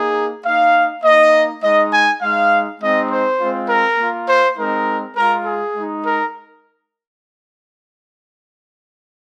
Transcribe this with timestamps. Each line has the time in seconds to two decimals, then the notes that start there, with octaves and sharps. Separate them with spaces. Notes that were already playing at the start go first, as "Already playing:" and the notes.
Already playing: A#3 D#4 G#4
0.45 A#3 D#4 F5
1.04 A#3 D#4 D#5
1.63 G#3 D#4 D#5
1.92 G#5
2.22 G#3 D#4 F5
2.81 G#3 C4 D#4 D#5
3.09 C5
3.40 G#3 C4 F4
3.69 A#4
3.98 A#3 F4
4.28 C5
4.57 G#3 C4 D#4 A#4
5.16 G#3 F4 A#4
5.45 G#4
5.75 G#3 D#4
6.04 A#4